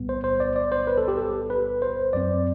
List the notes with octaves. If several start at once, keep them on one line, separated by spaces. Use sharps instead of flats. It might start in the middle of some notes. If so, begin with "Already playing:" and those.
Already playing: B1 A2 G3 B3
C5
C5
D5
D5
C5
B4
A4
G4
A4
B4
C5
F#2 F#3 C4 D5